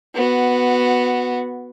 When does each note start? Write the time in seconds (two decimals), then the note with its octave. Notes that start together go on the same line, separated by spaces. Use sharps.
0.15 B3 F#4